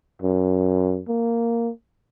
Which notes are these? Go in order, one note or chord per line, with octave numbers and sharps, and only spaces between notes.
F#2
A#3